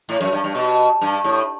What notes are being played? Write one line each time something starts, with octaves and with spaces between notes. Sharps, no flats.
A2
F#2
G2
G2
B2
G2
A2